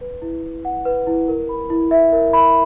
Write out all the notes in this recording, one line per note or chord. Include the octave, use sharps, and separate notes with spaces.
B4
E4
E4
F#5
B4
E4
A#4
B5
E4
E5
A#4
B5